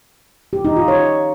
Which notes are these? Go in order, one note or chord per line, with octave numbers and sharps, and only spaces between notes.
G4
D#4
F4
C#5